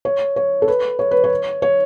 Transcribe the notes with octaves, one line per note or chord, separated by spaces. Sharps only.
C#5
C#5
A4
B4
C#5
B4
C#5
C#5